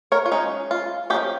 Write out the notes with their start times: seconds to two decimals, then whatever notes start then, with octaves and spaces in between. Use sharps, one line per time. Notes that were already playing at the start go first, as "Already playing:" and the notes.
0.12 A#4 C#5
0.26 F4
0.32 G#3 C#4 D#4
0.71 F4
1.10 F3 A#3 C#4 D#4 G4